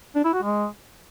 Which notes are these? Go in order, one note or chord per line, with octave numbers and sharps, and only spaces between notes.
D4
E4
F#4
G#3